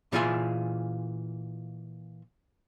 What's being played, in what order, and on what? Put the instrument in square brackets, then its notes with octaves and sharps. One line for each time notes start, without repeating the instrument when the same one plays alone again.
[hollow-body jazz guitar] A#2 E3 F4 G#4 E5 G#5